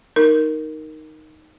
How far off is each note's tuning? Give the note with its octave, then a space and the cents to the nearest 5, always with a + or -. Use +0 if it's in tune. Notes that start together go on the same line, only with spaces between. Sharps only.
D#4 +0 A#4 +0